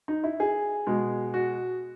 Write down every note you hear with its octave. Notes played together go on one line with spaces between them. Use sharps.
D#4
E4
G#4
B2 G#3
F#4